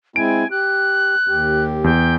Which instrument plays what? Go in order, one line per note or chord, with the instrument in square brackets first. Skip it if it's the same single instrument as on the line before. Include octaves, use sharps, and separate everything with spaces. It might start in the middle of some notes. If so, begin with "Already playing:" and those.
[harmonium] G#3 C4 E4 [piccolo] G#5 [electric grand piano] D7
[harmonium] G4 [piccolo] F#6
[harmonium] D#2 G4
[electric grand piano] E2 [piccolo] G5